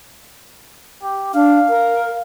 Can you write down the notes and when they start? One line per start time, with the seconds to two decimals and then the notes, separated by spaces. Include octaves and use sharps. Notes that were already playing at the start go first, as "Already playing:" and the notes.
1.03 G4
1.34 D4 F5
1.69 A#4